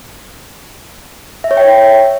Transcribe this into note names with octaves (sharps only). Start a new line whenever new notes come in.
E5
C#5
G5